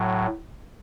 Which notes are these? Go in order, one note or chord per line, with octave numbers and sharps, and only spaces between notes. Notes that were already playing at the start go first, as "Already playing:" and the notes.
Already playing: A2 F#3